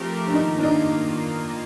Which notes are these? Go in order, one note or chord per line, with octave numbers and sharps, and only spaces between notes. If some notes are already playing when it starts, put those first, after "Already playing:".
Already playing: F3 A3 C4 G4 A#4
D4
D#3 A#3 D#4 F4
D4
D#4